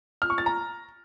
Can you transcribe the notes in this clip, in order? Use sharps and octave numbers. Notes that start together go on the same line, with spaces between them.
F6
C#6
A6
A#5